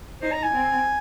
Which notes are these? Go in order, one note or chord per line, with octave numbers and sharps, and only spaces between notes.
D#4 C5
A#5
G#5
C4